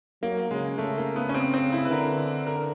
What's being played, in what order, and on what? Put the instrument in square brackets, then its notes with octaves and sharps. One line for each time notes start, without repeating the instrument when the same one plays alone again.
[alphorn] F#3 [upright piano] A#3
[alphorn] C#3 [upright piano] G#3
[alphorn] C#3 [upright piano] A3
[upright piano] A#3
B3
C#4
C4
C4
E4
B4
[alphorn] D3 [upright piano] A#4
[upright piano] A#4